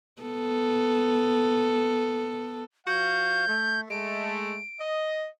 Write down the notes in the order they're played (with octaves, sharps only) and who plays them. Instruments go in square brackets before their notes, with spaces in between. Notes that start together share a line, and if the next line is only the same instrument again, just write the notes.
[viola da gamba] B3 A4
[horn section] F3 F#4 F5 [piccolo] G6
[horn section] A3
[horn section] G#3 A3 [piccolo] D7
[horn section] D#5